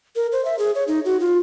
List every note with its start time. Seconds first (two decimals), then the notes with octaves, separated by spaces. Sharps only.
0.16 A#4
0.32 C5
0.45 E5
0.59 G#4
0.75 C#5
0.88 D#4
1.05 F#4
1.20 F4